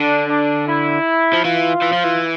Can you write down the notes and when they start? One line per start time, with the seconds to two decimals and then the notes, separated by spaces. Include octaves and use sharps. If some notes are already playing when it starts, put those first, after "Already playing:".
Already playing: D3 D4
0.29 D4
0.67 E4
1.33 F3
1.44 E3 F4
1.82 E3
1.93 F3
2.04 E3